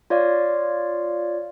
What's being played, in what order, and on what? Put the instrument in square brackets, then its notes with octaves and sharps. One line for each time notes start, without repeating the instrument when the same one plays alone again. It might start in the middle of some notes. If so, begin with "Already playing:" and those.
[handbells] F4 C#5 D5 F5